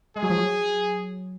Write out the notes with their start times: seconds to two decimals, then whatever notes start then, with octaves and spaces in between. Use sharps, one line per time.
0.16 G#3 G#4
0.23 F#3
0.30 F3
0.37 F#3